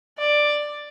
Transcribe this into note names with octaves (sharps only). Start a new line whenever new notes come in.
D5